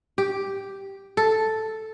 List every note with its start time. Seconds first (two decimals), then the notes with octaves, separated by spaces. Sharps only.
0.18 G4
1.17 A4